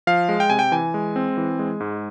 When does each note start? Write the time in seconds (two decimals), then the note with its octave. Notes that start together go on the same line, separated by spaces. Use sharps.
0.07 F3 F5
0.29 G#3
0.40 G5
0.50 C3 G#5
0.59 G5
0.72 E3 G#5
0.94 G#3
1.16 C4
1.37 E3
1.59 G#3
1.80 G#2